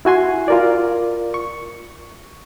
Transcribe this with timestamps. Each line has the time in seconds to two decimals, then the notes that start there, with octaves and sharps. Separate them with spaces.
0.05 E4 F#4 G#5 C6
0.48 F4 A#4 D5
1.34 C#6